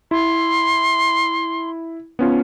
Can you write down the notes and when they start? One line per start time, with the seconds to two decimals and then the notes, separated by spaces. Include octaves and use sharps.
0.11 E4 C6
2.19 B3 C#4 F4